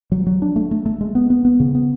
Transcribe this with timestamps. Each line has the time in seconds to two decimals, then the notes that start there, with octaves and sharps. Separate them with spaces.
0.12 F#3
0.26 F#3
0.42 D4
0.56 A3
0.71 A3
0.86 A3
1.01 G#3
1.15 B3
1.30 B3
1.45 B3
1.60 C#3
1.75 B3